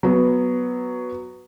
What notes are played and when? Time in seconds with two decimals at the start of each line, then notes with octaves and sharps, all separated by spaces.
0.03 F#3 B3